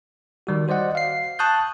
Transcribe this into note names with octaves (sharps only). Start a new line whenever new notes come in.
D#3 G3 F#4
F#4 C5 D5 D#5 F#5
F5 C7
A5 C#6 D#6 F#6 G6